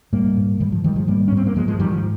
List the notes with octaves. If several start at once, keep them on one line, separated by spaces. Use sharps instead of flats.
G#2 G3 A#3
G#2
G#2 D#3 G3
F3
G#2 D#3 G3
F3 G#3
G#2 G3 A#3
C#4
G#2
C4
A#3
G#2 F3 G#3
F3 G#3
G#2 D#3 G3
F3